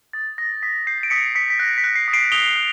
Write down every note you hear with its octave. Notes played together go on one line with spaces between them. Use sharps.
D#6 A6
D#6 A#6
D#6 B6
G6 C7
D7
D#6 B6 C#7
D#6 B6 C#7
B6
F#6 A#6
B6
F#6
C7
D#6
C7 D7
D#6 F7 G7
F#6